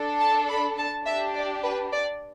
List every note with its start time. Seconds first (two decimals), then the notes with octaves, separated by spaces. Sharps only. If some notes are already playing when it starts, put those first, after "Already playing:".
Already playing: D4 A4
0.20 A5
0.49 B5
0.78 A5
1.06 D4 G4 E5
1.34 D5
1.63 B4
1.92 D5